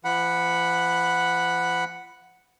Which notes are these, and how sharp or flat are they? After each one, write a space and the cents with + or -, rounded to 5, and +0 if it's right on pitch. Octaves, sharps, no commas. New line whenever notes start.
F3 -40 F#5 +0 B5 +0